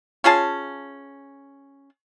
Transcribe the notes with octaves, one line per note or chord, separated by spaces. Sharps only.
C#4 F4 G#4 A5